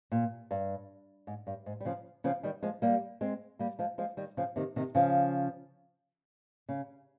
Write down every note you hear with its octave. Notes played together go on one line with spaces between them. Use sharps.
A#2
G2
G#2
G2
G#2
G3
C#3 F3
C#3 F3
D#3 G3
F3 G#3
G3 A#3
G#3 C4
G3 A#3
F3 G#3
F3 G#3
D#3 G3
C#3 F3
C3 D#3
C3 D#3
C#3 F3
C#3